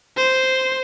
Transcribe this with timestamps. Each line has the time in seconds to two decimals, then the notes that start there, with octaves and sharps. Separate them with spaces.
0.17 C5